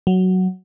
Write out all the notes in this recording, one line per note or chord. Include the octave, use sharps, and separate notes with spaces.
F#3